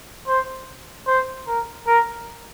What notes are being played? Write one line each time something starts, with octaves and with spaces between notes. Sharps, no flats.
C5
C5
A#4
A#4